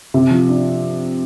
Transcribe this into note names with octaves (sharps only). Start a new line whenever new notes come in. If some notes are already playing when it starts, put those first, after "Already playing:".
C3
F3
D4